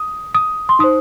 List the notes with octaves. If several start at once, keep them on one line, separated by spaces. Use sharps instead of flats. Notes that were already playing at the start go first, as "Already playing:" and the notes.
Already playing: D#6
D#6
C6
D#4 C5 D#6